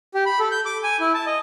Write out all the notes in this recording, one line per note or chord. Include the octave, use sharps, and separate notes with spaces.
G4
B5
A4
G6
D6
G#5
E4
A5
D#5